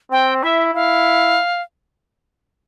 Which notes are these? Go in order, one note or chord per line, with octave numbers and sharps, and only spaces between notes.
C4 G5
E4 E5
E4 F5